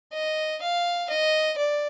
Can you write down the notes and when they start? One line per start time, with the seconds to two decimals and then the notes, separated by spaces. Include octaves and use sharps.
0.13 D#5
0.62 F5
1.10 D#5
1.58 D5